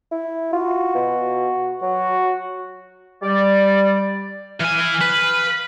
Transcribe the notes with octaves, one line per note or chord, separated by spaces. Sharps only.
E4
F4 F#4
B2
F#3 F#4
G3 D5
E3 F5 G#5
B4